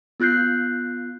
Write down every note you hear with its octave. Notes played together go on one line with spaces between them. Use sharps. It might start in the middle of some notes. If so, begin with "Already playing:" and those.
B3 F4 F#6 G6 C7